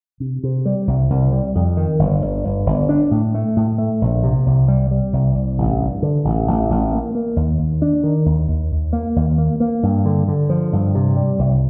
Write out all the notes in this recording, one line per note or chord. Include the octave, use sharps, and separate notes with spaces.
C3
C3
G3
C2
C2
G3
F2
D#3
G1
G1
G1
G1
D4
A2
A3
A2
A3
A#1
C3
C2
G3
G3
C2
C2
A1
G2
D3
A1
A1
A1
A#3
A#3
D#2
D#2
D4
D#3
D#2
D#2
D#2
A#3
D#2
A#3
A#3
G2
D3
D3
F3
G2
C3
G3
C2